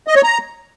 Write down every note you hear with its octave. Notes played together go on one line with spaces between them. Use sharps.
D#5
C#5
A#5